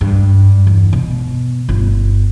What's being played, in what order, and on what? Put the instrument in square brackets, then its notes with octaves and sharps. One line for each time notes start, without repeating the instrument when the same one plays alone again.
[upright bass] G2
E2
B2
G1